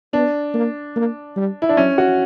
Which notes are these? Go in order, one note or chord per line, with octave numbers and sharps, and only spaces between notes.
B3 D4
A#3
A#3
G3
E4
D4
F#3 C#4
F#4